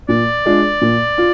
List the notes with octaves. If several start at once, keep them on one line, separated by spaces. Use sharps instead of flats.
A#2 D5
G#3 D4 F4
A#2
F4